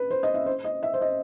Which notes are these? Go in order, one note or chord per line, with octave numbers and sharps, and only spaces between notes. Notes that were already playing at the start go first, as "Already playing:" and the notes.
Already playing: B4
C5
D#5
E5
C5
D#5
E5
C5
D#5